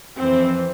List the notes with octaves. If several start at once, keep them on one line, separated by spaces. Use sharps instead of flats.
F2 E3 C4